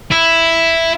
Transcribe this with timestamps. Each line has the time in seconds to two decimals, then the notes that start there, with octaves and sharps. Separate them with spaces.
0.11 E4